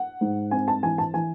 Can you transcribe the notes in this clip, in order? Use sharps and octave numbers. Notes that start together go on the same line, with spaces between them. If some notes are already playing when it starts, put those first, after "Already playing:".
Already playing: F#5
G#2
C4 G#5
A5
E3 G#5
A5
E3 G#5